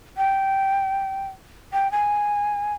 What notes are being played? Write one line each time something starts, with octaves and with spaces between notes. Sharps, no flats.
G5
G5
G#5